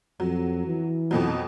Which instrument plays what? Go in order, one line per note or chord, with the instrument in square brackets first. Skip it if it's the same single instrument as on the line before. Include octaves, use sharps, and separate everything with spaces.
[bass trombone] F2 [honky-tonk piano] F#3
[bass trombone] E3
[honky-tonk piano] F2 B2 F#3